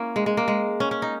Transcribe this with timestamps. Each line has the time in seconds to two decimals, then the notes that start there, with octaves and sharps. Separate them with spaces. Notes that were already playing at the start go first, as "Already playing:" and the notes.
Already playing: A#3 C#4 E4
0.16 G#3
0.26 G#3
0.37 A#3
0.48 G#3
0.80 C#4
0.91 C#4
1.02 D#4